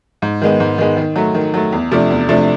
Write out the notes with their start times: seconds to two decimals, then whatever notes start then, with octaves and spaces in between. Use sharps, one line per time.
0.22 G#2
0.42 D#3 G#3 B3
0.60 G#2
0.78 D#3 G#3 B3
0.97 D#3
1.16 F#3 A3
1.34 D#3
1.54 F#3 A3
1.72 E2
1.91 C3 F3 A3 D4
2.10 E2
2.29 C3 F3 A3 D4